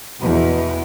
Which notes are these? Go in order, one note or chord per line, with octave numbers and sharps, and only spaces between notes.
E2 B2